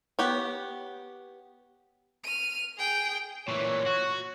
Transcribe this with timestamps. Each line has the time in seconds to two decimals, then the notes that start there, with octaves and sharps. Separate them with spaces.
0.19 B3 G4 C#5
2.24 F6 D#7
2.78 G#4 G5
3.48 A#2 E3 C#5
3.86 F#4